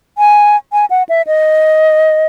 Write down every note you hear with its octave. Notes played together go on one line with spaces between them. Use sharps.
G#5
G#5
F#5
E5
D#5